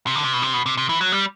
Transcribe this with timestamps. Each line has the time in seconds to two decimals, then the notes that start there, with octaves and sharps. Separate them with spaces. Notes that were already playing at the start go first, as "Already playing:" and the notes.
0.07 C3
0.15 D3
0.24 C3
0.33 B2
0.42 C3
0.53 B2
0.66 C3
0.77 C3
0.89 E3
1.01 F#3
1.12 G3